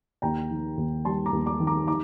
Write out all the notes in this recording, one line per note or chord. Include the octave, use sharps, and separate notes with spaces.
D#2 G5 A#5
D#3
D#2
G3 A5 C6
A#5 D6
D#2
A#5 D6
D#3
A#5 D6
D#4 A#5 D6